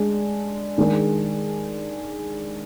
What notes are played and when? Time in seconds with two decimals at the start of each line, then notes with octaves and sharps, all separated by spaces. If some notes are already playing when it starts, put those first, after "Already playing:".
Already playing: G#3 D4
0.78 D#3 G#3 D4 G#4